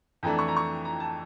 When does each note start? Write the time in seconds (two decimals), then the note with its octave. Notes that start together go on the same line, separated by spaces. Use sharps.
0.23 F2 E3 A3 D4 A#5
0.39 C#6
0.48 A#5
0.56 C#6
0.85 A#5
1.00 A5